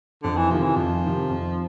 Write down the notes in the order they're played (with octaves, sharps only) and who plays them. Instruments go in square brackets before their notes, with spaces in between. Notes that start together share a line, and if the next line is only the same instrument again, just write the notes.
[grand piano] F2 [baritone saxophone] D3
[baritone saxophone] E3
[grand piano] C3 D#3 [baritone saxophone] F3
[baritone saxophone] E3
[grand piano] F2 [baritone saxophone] F3
[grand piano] C3 D#3
F2